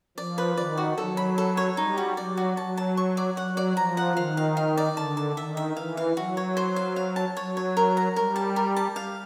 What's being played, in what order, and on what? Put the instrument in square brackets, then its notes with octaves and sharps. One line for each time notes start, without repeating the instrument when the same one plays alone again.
[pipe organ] F3 [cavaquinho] D5
[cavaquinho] B4
[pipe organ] D#3 [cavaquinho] D5
[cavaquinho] F#4
[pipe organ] F#3 [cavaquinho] A4
[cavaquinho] B5
A4
C#5
[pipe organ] G3 [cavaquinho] D#4
[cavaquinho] F#4
[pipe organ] F#3 [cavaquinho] D5
[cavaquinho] F#4
[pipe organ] F#3 [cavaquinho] A5
[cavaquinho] A5
C#6
D5
[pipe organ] F#3 [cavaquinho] F#5
[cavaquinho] D5
[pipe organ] F3 [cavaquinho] A#5
[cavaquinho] F#5
[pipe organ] D#3 [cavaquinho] F5
[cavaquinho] F5
F5
D5
[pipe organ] D3 [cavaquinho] A5
[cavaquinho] A5
[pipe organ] D#3 [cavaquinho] E5
[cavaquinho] E5
[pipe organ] E3 [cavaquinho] F5
[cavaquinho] F5
[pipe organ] F#3 [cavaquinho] F#4
[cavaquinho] C#5
C5
F5
F5
A5
[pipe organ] F#3 [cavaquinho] C#5
[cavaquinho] C#5
A#4
A#5
[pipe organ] G3 [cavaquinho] A#4
[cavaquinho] A5
A#4
A5
F5